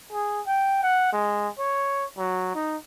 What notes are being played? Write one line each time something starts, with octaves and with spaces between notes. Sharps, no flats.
G#4
G5
F#5
G#3
C#5
F#3
D#4